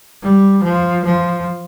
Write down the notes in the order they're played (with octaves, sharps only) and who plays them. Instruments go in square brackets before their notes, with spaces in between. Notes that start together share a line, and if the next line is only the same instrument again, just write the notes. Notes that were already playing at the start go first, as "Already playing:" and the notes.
[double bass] G3
F3
F3